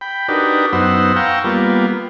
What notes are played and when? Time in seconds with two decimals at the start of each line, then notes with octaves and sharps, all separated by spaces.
0.01 G5 B5
0.28 D4 D#4 F#4 G4 A#4 B4
0.73 F#2 B3 D#4 C5 F#5 E6
1.16 F5 G5 A#5 C#6 E6
1.44 G3 A#3 B3 F4